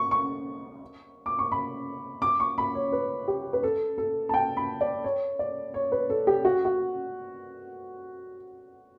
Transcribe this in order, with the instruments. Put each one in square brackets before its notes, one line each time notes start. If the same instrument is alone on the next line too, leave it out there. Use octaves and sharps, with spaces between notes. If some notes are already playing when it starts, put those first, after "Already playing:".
Already playing: [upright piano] C#6
C#6
D6
C#6
B5
D6
C#6
B5
C#5
B4
G4
B4
A4
A4
A5
G5
B5
D5
C#5
D5
C#5
B4
A4
G4
F#4
F#4